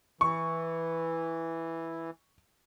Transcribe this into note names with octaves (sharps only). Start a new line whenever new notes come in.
E3 C#6